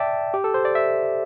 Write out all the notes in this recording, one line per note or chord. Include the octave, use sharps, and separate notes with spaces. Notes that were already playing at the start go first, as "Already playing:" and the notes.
Already playing: D5 E5 G5 A5
G4
A4
C5
D5
E5